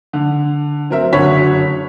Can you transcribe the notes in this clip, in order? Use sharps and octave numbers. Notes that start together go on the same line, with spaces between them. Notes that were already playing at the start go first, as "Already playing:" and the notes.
D3
F#3 C4 A#4 E5
F#1 D3 F#4 C#5 B5 B6